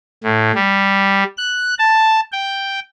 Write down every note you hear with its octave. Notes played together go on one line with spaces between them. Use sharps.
A2
G3
F#6
A5
G5